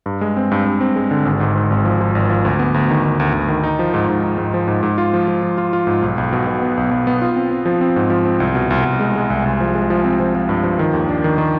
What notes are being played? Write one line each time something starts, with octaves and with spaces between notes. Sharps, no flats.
G2
G#3
C4
G2
G2
C4
G#3
D3
G#1
G#2
G#2
G#1
F3
F3
G#1
F3
D2
B3
D2
D#3
D#3
D2
D2
D#3
D#4
F3
G#2
G#2
D#4
G#2
F3
G#2
G#2
F4
F3
F3
F3
F4
F4
G#2
B1
B1
B2
B2
B3
B1
B1
B3
F4
C4
C4
F3
C4
G#2
F3
C4
C2
B2
C2
C2
G#3
G#3
C2
C2
F3
G#3
F3
C4
F3
F3
G2
F3
D#3
D#2
D4
D#3
D#3